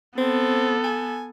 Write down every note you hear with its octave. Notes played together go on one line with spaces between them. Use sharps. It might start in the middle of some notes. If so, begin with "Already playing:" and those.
B3 C4 A4
G#5